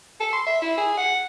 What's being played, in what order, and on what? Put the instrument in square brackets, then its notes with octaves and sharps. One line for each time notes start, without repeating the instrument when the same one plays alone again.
[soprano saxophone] A4
C6
E5
E4
G#4
F#5